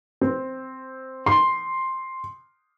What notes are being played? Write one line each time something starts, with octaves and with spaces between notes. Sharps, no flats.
C4
C6